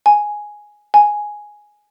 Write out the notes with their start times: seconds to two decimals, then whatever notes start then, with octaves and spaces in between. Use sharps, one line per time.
0.06 G#5
0.94 G#5